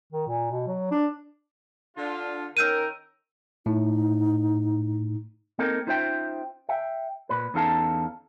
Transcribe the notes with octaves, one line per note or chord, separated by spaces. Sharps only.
D#3
A#2
B2
F#3
D4
D3 D4 F4
D#3 C#4 A#4 E6 G6 D#7
A2 D#4
A#3 C4 D#4 A4 A#4
C#4 D#4 F4 C5 E5 G5
E5 G5
A#2 B4
E2 C#4 D#4 A4 F5 A5